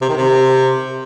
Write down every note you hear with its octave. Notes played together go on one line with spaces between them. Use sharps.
C3
D#3
C3